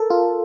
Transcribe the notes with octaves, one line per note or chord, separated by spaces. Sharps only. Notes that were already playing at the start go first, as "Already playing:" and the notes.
Already playing: A4 A#4
F4